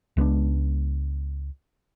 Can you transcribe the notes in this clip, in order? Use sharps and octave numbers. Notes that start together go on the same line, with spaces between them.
C#2 G#3 B3 D4